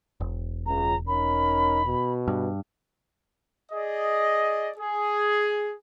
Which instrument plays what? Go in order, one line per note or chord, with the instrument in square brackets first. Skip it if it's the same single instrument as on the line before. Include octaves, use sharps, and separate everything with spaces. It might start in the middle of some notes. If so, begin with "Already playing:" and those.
[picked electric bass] E1
[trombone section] C#2 [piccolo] A#5
[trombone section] C#4 D#4 A#4 [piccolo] B5
[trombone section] B2
[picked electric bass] G2
[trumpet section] G#4 D5 D#5
G#4